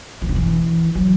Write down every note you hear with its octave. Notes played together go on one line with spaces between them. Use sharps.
E3
D3
E3
F#3